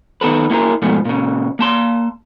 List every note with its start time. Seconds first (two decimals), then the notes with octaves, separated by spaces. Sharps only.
0.21 D#3 B3 A4 B4
0.50 A#3 E4 G#4 A#4
0.82 G#2 B2 F3 A3
1.05 A#2 C#3
1.59 A#3 A5 C6